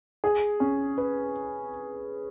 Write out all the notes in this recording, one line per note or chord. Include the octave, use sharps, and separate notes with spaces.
G#4
C#4
B4